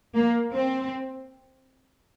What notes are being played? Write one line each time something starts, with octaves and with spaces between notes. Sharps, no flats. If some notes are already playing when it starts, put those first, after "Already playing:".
A#3
C4